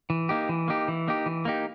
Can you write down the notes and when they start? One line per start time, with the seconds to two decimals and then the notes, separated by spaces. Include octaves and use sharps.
0.10 E3
0.29 A#3 D#4 G4
0.49 E3
0.68 A#3 D#4 G4
0.88 E3
1.08 A#3 D#4 G4
1.26 E3
1.45 A#3 D#4 G4